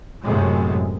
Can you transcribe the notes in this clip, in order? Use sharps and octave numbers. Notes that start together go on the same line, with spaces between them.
F#2 A2 C3 G#3